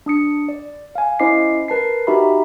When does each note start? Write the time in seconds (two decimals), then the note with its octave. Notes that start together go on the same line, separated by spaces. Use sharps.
0.06 D4 D#6 C#7
0.49 D5
0.95 F5 G#5
1.19 C#4 E4 C5 D#5 D6 C7
1.68 A#4 B4 A5 C7
2.07 D#4 F#4 G4 E5 A#5 B5